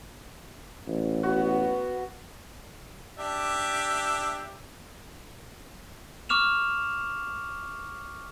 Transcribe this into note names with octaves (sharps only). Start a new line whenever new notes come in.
A1
B3 F#4
D4 G4 E5
C#6 D6 F6 E7 F7